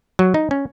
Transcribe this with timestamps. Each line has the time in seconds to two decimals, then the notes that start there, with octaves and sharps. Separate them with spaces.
0.19 F#3
0.34 D#4
0.51 C#4